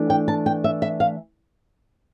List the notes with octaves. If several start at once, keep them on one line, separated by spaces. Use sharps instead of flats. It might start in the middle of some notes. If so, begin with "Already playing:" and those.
Already playing: E3 A3 D4
G5
A5
G5
E5
E5
F5